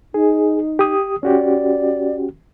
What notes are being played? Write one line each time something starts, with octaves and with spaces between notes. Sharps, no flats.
D#4 G#4
G4 D#6
C#4 F#4 G4 D5